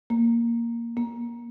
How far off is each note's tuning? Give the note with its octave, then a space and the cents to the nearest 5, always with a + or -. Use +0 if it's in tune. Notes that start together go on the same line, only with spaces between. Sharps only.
A#3 +0
A#3 +20